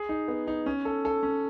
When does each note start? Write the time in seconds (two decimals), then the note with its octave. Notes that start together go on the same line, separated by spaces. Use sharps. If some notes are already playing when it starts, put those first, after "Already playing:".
Already playing: G#4
0.09 D#4
0.28 B3
0.47 D#4
0.66 C#4
0.85 A4
1.05 A4
1.23 C#4